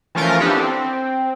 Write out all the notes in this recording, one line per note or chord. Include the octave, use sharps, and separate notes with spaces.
E3 F3 A3 C#4 F4 A#4
B3 D4 E4 G4 A4
C4